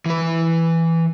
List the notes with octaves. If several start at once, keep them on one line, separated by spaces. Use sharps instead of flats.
E3 B4